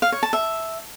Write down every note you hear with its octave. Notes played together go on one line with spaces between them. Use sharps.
F5
C#5
A5
E5